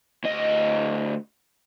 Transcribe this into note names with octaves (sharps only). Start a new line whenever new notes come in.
D2 D#5